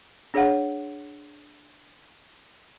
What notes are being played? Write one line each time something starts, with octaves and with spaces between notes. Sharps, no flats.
D4 G#4 C#5 F5 F#5